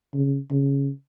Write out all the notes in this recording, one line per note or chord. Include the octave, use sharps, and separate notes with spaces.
C#3
C#3